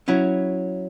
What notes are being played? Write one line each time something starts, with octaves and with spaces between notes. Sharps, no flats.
F#3 C#4 E4